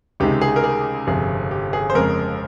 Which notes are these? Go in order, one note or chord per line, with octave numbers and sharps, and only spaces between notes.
C#2 C3 D#3 G#3 G4
G#4
A#4
G#4
G1 F2 C3 G#4
G4
G#4
C5
F2 C#3 G#3 A#4